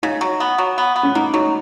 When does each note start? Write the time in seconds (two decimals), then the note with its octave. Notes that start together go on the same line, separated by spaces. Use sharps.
0.03 C#3 D#4
0.21 F#3
0.40 B3
0.58 F#3
0.78 B3
0.96 B3
1.03 C#4
1.15 A#3 D#4
1.34 F#3 D#4